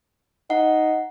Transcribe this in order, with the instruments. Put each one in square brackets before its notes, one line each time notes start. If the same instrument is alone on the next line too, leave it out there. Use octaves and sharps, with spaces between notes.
[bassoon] D#4 [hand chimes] F#5